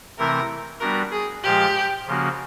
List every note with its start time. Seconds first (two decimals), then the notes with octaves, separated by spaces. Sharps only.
0.19 C3 E3 A3 C4 E4 A#4
0.80 G3 B3 D4 F#4 A#4
1.12 G#4
1.43 A#2 F3 G#3 G4
2.07 C#3 F3 A#3 C#4 F#4